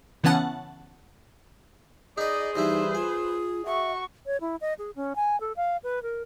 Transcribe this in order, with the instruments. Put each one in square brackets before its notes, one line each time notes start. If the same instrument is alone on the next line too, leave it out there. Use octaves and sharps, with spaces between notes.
[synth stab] C#3 E3 B3 C#4 F#5 A5
[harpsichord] D#4 B4 [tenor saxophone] G#4 [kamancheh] D5 D#5
[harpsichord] G2 E3 E4 [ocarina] D#4 [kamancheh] B4 C5
[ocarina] F4 [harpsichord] G#5
[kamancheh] F#4 C#6 [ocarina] E5
[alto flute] C#5
E4
D#5
G#4
C#4
G#5
A4
F5
B4
A#4